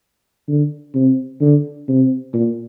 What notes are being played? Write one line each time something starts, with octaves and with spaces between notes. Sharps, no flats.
D3
C3
D3
C3
A#2